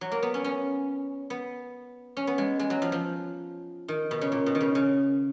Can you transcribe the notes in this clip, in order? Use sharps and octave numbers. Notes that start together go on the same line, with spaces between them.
F#3
A#3
B3
C#4
C#4
B3
C#4
B3
G#3
G#3
F#3
F3
F3
D#3
B2
C#3
A#2
B2
D#3
C#3
C#3